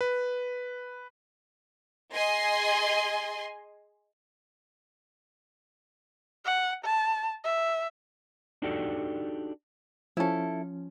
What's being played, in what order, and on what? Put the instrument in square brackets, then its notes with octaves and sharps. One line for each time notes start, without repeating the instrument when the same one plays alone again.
[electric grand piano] B4
[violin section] G#4 D#5 G#5 C6
[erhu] F#5
A5
E5
[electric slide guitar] D4 D#4 F#4 G4 A4 D5
[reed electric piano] F3 C#4 [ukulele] E4 A4